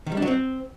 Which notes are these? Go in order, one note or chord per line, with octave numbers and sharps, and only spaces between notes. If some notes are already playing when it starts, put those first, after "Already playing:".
D#3
G3
D4
F#3
C4